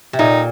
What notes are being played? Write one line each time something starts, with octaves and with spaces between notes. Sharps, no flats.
C3
A#2 D#4